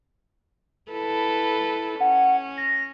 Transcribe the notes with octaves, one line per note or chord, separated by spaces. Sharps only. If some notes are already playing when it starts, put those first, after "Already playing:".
E4 A4 B4
C#4 F#5
A#6